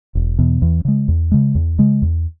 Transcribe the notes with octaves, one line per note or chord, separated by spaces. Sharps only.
E1
E2 B2
E2
C#3 G#3
E2
C#3 G#3
E2
C#3 G#3
E2